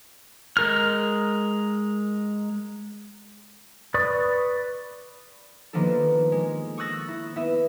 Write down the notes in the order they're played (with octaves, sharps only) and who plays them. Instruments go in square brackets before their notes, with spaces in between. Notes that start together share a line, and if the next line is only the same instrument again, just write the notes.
[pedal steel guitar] G#3 A#4 F6
B4 D5 C#6 D#6
[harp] D#3 F3 A#3 B3 D4 A4
G#3
C#6 D#6 E6 F#6 A6 A#6
E4
B3 E4 E5